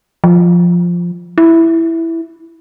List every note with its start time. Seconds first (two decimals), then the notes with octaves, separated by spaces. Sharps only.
0.24 F3
1.38 E4